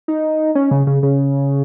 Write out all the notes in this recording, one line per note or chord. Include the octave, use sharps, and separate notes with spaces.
D#4
C#4
C#3
C#3
C#3